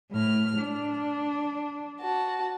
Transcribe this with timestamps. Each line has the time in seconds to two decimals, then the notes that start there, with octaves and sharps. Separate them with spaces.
0.12 A2 F6
0.61 D4
2.01 F#4 A5